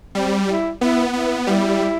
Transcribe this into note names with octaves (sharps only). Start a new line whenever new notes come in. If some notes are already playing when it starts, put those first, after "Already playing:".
G3 C4
E4
B3 E4
B3 E4
G3 E4